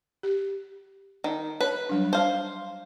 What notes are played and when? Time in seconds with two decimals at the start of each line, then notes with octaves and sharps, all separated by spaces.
0.23 G4
1.24 D#3
1.61 B4 C#5
1.89 F#3 G3 D4
2.13 C5 F5